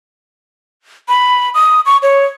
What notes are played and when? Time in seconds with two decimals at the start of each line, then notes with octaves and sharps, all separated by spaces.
1.08 B5
1.54 D#6
1.86 C#6
2.03 C#5